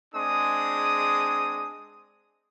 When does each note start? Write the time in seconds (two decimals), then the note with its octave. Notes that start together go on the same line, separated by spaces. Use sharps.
0.15 G#3 C4 D4 G#4 D#6